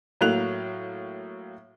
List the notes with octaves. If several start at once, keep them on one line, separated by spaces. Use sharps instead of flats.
A2 F#3 A#3 F#6 F7